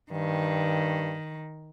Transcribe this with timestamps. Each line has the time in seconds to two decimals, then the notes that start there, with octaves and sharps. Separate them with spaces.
0.12 G2 D#3